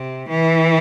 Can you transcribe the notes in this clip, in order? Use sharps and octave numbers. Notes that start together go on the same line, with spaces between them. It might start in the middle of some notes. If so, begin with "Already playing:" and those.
Already playing: C3
E3